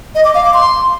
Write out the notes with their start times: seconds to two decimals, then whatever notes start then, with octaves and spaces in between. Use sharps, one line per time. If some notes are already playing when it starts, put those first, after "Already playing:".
0.15 D#5
0.25 D6
0.34 F5
0.44 D6
0.54 C6